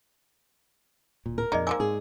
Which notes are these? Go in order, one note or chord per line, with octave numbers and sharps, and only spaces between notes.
D1 A#2
A#4
F2 A#2 D#4 G#4 D5 D#5
A#3 C4 D#4 G#5 D6 E6
G#2 G#4